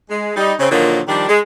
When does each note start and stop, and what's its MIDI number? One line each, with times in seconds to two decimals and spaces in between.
0.09 0.31 56
0.36 0.53 55
0.36 0.53 63
0.59 0.70 49
0.59 0.70 60
0.71 1.01 46
0.71 1.01 50
0.71 1.01 51
0.71 1.01 53
0.71 1.01 54
0.71 1.01 58
1.08 1.29 51
1.08 1.29 53
1.08 1.29 55
1.08 1.29 62
1.29 1.39 56